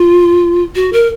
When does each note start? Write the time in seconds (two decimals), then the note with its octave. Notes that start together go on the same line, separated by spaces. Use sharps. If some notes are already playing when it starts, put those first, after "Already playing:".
Already playing: F4
0.75 F#4
0.93 A#4